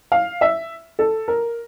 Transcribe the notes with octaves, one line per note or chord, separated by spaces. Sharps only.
F5
E5
A4
A#4